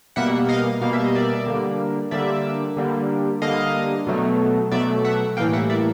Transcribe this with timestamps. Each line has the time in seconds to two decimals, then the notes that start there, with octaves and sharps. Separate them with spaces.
0.16 B2 G3 A#3 E5 F#5
0.49 D#5 F5
0.81 B2 G3 A#3 F5
0.93 E5
1.04 D#5
1.15 D5 E5
1.46 D3 G3 A#3
2.11 D3 G3 A#3 D5 E5
2.77 D3 G3 A#3
3.42 D3 G3 A#3 D#5 F5
4.07 B2 F#3 A3
4.71 B2 F#3 A3 D5 E5
5.04 E5 F#5
5.37 A2 E3 G3 A#3 F5 G5
5.53 E5 F#5
5.70 D5 E5